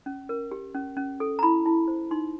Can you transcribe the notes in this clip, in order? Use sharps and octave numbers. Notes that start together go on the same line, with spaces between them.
C#4
A#4
G4
C#4
C#4
A4
A#5
E4 B5
E4
C5
D#4 C6